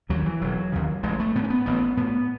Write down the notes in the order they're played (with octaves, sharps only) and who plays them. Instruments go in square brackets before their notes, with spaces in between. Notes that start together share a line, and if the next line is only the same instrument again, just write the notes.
[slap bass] D#2 C#3 F#3
E3
E1 F#3
D#2 C#3
A1 G#3
A3
A2 B3
C#4
B3
A1 B3
A2 B3